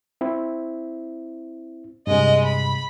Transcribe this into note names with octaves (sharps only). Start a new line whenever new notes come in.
C4 E4
G2 C3 G#3 D#5
B5